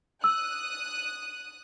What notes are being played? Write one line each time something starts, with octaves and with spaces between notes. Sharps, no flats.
D#6 E6 F#6